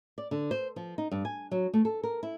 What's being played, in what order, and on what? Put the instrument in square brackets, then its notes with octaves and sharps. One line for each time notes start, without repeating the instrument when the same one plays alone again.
[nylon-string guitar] D5
D3
C5
F3
D#4
G2
G#5
F#3
A3
A4
A#4
E4